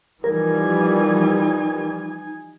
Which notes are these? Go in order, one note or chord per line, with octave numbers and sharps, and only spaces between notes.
E3 F3 G3 D#4 A#4 G#5